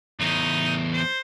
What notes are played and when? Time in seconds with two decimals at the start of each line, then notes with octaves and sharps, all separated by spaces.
0.20 E2 A2 D#4
0.93 C5